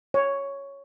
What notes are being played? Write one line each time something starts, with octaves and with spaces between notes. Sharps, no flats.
C#5